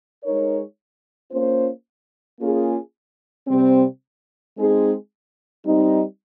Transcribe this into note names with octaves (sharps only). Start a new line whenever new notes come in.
G#3 D#4 A#4 C#5
A#3 C#4 F4 C5
A#3 C#4 F4 G#4
C3 G3 C4
G#3 C4 D#4 G#4
G3 C4 D#4